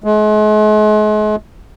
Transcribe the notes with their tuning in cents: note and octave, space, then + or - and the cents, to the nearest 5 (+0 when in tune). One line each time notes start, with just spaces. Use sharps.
G#3 +40